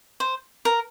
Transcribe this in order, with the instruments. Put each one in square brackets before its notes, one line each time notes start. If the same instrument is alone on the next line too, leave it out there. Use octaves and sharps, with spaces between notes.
[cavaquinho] C5
A#4